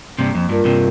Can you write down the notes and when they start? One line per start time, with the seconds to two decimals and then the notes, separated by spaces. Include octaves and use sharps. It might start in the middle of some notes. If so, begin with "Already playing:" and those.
0.18 G2 C3 A#3
0.35 F2
0.49 G2 F4 A#4
0.65 G2 C3